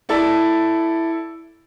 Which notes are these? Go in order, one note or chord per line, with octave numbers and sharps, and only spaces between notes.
E4 A4 D5